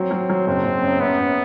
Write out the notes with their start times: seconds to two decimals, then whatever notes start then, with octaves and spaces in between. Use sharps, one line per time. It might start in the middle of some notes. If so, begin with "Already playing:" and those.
Already playing: F#3 C4
0.11 F#3
0.30 F#3
0.47 F#1 C4
0.65 F#1
0.83 F#2
1.00 F#2 B3
1.19 F#2